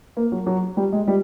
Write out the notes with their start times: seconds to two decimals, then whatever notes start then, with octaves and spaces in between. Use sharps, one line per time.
0.17 A#3
0.32 F#3
0.46 F#3
0.77 G3
0.93 G#3
1.08 G3